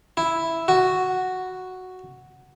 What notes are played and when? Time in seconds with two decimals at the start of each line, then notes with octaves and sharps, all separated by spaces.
0.17 E4
0.68 F#4